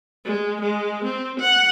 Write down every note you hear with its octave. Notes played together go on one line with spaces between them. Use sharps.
G#3
G#3
C4
F#5